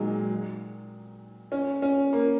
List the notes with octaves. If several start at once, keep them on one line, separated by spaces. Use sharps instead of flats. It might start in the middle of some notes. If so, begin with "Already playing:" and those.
Already playing: A#2 D#3 F#3 G#3
C#4
C#4
A#3